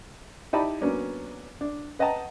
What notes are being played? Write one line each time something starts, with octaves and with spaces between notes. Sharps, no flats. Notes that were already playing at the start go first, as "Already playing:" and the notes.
D#4 E4 G4 D5 A5 B5
F#3 A#3 B3 C#4 D4
D4
B4 D#5 F#5 G5 A5 A#5